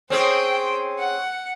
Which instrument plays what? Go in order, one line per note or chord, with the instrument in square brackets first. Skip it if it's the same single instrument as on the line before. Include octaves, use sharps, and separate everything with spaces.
[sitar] C4 C#4 G#4 [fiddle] C5 G5
[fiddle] F#5